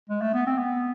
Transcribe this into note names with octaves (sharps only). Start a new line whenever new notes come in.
G#3
A3
B3
C4
B3